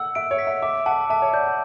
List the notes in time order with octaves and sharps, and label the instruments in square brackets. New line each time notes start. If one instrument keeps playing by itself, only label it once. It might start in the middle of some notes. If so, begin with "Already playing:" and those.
Already playing: [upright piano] F#5 [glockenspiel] E6
[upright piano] E5 [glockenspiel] D7
[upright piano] C#5
[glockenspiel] B6
[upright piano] E5
[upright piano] E5 [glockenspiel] D6
[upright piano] F#5 [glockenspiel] A5
[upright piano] E5 [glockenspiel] A5
[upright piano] C#5
[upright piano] D5 [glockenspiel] G6